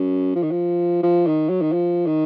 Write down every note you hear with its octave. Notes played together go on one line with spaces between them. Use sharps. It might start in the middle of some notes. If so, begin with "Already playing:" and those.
Already playing: F#2
F3
D#3
F3
F3
D#3
F#3
D#3
F3
D#3